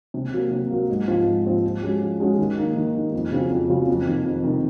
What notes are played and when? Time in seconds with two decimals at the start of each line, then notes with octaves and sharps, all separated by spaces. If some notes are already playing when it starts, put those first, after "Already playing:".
0.14 C3
0.33 F#3 A#3
0.51 C3
0.70 F#3 A#3
0.89 G#2
1.07 F3 C4 F4
1.26 G#2
1.45 F3 C4 F4
1.64 F3
1.82 G#3 C#4 F#4
2.01 F3
2.20 G#3 C#4 F#4
2.38 D#3
2.57 A#3 D#4
2.76 D#3
2.95 A#3 D#4
3.14 F2
3.31 C#3 F#3 C4 F4
3.51 F2
3.69 C#3 F#3 C4 F4
3.88 F2
4.07 C3 D#3
4.25 F2
4.44 C3 D#3